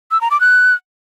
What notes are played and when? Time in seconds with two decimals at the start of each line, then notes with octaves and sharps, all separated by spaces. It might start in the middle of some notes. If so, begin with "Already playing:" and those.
0.11 E6
0.21 A#5
0.31 D6
0.41 F#6